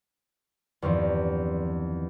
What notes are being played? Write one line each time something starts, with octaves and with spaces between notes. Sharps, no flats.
E2 G2 D#3 F3 C4